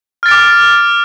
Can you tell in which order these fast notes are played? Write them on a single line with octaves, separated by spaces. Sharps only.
F6 A6 D7 D6